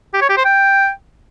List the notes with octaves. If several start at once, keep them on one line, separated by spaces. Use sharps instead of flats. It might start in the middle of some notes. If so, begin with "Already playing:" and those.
G4
C#5
G4
C5
G5